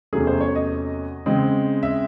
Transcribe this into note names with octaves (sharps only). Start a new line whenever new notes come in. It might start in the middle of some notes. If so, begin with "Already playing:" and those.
E2 C3 F#3 A3 C#4 G#4
C5
C#5
D#5
C#3 G#3 C4
E5